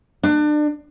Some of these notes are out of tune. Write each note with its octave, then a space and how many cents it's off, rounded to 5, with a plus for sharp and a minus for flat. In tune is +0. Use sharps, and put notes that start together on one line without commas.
D4 +30